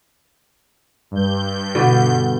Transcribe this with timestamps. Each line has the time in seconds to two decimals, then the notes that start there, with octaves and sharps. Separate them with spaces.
1.11 G2 G6
1.75 B2 D3